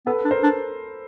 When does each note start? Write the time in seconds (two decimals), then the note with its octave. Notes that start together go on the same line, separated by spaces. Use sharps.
0.06 B3 A4 B4
0.25 D4
0.31 A#4 C5
0.43 D4